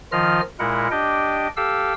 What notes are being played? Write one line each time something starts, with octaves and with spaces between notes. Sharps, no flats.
D#3 F3 F4 D#5 F6
A#2 G#3 E4 A#4 F#5
D4 G4 D#5 G5
G4 A4 F5 E6